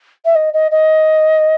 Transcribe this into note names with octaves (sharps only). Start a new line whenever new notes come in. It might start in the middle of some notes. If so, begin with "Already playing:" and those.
E5
D#5
D#5
D#5